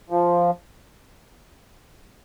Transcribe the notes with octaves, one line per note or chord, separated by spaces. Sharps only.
F3